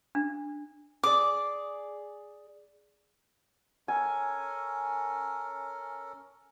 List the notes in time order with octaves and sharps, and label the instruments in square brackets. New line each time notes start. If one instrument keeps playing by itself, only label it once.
[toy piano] D4
[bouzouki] G#4 D5 [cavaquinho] D6
[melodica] C#4 A4 A#4 [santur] G#5